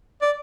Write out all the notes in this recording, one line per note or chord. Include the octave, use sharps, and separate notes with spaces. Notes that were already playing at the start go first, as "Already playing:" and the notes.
D5